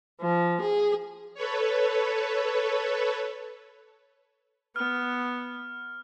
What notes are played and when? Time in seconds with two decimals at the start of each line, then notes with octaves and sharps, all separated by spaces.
0.21 F3
0.61 G#4
1.34 A4 B4 C#5
4.76 B3 F6